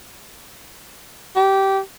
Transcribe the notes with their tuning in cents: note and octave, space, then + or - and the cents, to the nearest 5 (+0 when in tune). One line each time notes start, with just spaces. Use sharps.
G4 -15